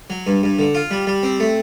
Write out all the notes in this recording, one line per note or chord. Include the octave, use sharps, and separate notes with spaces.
F#3
G2
G2
D3
F4
G3
G3
C4
A3